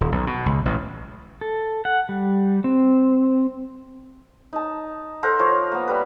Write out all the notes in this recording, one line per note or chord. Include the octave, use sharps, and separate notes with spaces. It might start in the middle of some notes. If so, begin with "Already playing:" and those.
D#1
B1
B2
C#2
A1
A4
F#5
G3
C4
D#4 A5
A4 A#4 C5 F#5
F3 A#4 C#5
A#3 B3
G3 B4